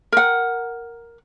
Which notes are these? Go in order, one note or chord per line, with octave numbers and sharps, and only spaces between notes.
A#4 F#5